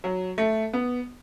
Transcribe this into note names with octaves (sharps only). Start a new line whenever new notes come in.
F#3
A3
B3